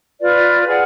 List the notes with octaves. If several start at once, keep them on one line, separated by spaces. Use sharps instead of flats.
F4 B4 D5
G#4 D5 F#5